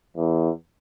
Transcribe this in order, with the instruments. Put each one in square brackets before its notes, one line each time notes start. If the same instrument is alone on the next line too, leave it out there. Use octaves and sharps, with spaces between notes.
[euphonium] E2